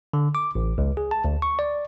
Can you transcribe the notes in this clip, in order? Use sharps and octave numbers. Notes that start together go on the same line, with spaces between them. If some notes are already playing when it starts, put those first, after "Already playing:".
D3
D6
A1
C#2
G#4
A5
D2
C#6
D5